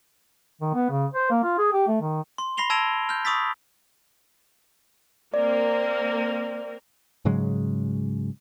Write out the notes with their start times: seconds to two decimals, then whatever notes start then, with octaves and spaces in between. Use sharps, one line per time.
0.62 D#3
0.74 B3
0.90 C#3
1.14 C5
1.31 A#3
1.44 F4
1.58 G#4
1.73 G4
1.88 A3
2.01 D#3
2.38 C6
2.57 B5 A#6 C7 F7 G7
2.70 A5 E6 G#6 A#6 D7 F7
3.09 F6 G6
3.25 B5 C#6 D#6 E6 A6 B6
5.34 A#3 C4 A#4 D5
7.25 G#2 C#3 F#3 G#3